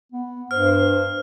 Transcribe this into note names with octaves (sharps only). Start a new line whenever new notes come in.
B3
G2 C5 F6